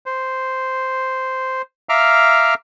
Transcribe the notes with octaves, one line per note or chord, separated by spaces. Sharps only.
C5
E5 F5 A#5 D6 F6